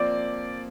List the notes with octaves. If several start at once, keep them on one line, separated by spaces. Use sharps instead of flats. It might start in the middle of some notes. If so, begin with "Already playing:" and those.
Already playing: F3 A#3 C4 D5